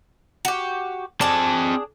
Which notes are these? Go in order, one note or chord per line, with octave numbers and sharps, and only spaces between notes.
F#4 G4
C4 D4 G#4 A5